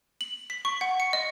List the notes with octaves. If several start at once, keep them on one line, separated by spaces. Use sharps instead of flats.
F#7
B6
C#6
F#5
C#7
D#5